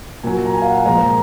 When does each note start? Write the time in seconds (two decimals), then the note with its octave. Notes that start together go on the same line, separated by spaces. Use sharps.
0.23 A#2 F#3 G#5
0.45 A#5
0.54 G#5
0.62 F5
0.70 F#5
0.78 G#5
0.85 A#2 F3 G#3 A#5
1.01 A#5